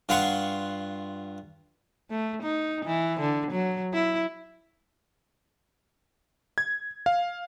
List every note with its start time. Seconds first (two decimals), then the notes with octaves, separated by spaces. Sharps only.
0.09 G2 F4 F#5 C6 C#6
2.10 A3
2.43 D#4
2.85 E3
3.20 D3
3.52 F#3
3.94 E4
6.58 G#6
7.06 F5